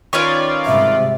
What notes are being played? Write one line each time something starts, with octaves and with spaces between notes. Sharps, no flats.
D#3 C#4 F4 B4 C#5 D5
G#2 C3 G3 E5